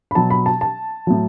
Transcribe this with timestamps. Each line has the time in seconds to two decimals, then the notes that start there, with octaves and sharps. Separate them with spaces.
0.11 B5
0.15 B2 F#3 A5
0.30 B5
0.46 A5
0.61 A5
1.07 A2 F#3